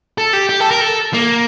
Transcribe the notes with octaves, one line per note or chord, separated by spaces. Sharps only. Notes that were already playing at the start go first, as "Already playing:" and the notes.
A4
G4
G4
A4
A#4
A4
A#3